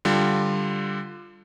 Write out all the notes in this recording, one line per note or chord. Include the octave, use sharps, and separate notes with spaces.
D3 G3 F4